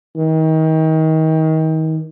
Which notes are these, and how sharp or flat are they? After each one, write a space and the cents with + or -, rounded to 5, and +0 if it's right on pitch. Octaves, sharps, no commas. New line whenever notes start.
D#3 +30